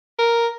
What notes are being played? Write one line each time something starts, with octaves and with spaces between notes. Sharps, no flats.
A#4